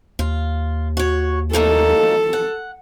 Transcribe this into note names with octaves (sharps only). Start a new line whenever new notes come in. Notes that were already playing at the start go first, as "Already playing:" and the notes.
D#2 F4
F#4 C#5
A2 A#3 D#4 A4
F#5